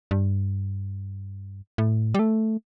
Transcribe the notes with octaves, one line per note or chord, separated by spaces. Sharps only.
G2
A2
G3
A3